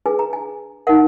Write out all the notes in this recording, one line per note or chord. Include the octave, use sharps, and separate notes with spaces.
D4 G#4 B4 G#5
A#5
G#5
D#4 A#4 F#5